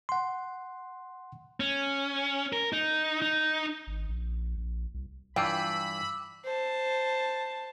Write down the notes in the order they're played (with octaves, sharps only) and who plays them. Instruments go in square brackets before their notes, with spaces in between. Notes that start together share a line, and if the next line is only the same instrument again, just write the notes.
[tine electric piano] F#5 C6
[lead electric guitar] C#4
A#4
D#4
D#4
[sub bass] G#1
A#1
A#1
C2
[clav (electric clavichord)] G2 E3 F4 [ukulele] G5 [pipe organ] B5 [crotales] D6 E6
[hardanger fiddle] C5 A5